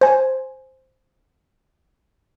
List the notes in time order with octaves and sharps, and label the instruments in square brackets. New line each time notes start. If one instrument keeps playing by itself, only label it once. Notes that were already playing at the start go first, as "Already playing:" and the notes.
[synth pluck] C5 G#5